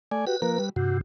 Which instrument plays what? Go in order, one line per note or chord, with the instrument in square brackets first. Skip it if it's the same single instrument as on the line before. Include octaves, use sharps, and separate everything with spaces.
[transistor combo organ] A3 D5 G#5
[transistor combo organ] F#4 G4 [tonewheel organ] B4
[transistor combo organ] F3 A#3 A#4 [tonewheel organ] B4
[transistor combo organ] G3
[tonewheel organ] G2 C3 [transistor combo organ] F#4